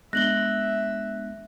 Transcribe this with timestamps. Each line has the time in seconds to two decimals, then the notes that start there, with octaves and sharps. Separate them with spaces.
0.13 G#3 B3 D4 E5 F#6 A#6 F#7 G7